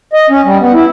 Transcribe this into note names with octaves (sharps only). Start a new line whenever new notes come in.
D#5
C#4
G3
B3
E4